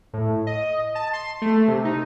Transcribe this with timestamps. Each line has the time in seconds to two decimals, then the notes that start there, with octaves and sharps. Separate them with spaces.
0.13 A2
0.47 D#5
0.95 A5
1.13 C6
1.42 A3
1.68 C3
1.85 D#4